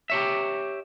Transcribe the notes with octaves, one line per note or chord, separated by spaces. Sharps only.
G4 C#5 E5